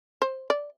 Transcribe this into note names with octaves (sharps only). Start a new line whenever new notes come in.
C5
D5